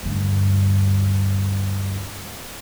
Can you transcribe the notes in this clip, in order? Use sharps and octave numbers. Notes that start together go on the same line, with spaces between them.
D2 G2